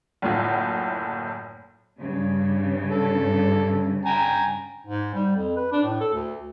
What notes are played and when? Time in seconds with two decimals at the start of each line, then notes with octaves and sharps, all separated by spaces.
0.22 F#1 D2 A2 F4
1.98 G2 C#3
2.91 A4
4.05 G5 G#5 A#5
4.86 G#2
5.14 G3
5.36 F2
5.56 B4
5.72 D4
5.84 A2
6.00 A4
6.14 D2